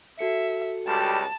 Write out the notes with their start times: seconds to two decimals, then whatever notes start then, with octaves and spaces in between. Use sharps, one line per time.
0.19 F#4 A4 E5 C#7
0.87 C#2 G3 A5